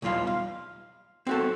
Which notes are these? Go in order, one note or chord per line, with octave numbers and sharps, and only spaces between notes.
B1 E2 G3 F4 F5
F5
C4 F#4 A4